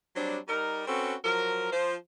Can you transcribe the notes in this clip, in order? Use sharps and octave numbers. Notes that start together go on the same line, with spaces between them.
F#3 G3 C4 D4
G3 D#4 A#4
C4 C#4 F#4 A4 B4
F3 F#3 A#4
F3 C5